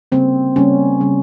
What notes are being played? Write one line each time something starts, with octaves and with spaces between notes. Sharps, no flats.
C#3 G3 A#3 C4
C#3 G3 A#3 C#4
C#3 G3 A#3